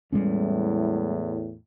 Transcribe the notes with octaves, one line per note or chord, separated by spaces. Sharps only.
E2 A2 G3 G#3 C#4